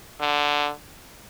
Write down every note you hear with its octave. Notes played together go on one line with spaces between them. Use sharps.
D3